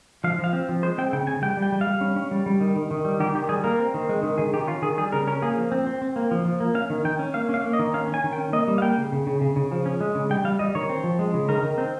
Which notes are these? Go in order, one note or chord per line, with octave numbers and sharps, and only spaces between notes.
F3 F5
F3
F5
C4
F3
G#3 C5
C4 G5
C#3 G5
C#3 G#5
G3 G5
G3
G5
G3
F5
G3
C#4
C#4
G3
G3
D#3
D#3
D#3
G3
D#3 G4
D#3 G4
G3 G#4
A#3 A#4
C4
D#3
G#3
D#3
D#3 G#4
D#3 G4
C#4 F4
D#3 G#4
G3 G#4
C#3 A#4
C#4 A#4
A#3 G#4
F3
C4
C4
C4
A#3
F3
F3
A#3
C#4 F5
D#3
D#3 G5
C#4
A#3 F5
C#4 F5
A#3
D#5
D#3
C#4 F5
C#4
G#5
D#3
G5
C#4
A#3 D#5
G3
F5
A#3 G5
C#3
C#3
C#3
C#3
C#3
F3
C#4
G#3
C#3
G3 G5
G3 F5
G3 D#5
D#3 C#5
C4
F3
G#3
C#3
D#3 A#4
D#3
C4